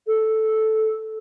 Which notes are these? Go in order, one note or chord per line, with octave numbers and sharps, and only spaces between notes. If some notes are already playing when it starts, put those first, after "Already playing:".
A4